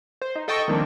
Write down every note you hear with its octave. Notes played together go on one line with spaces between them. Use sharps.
C5
D#4
A4 D#5 G5 A5 C#6
D#3 F3 G3 A#3 C4 D4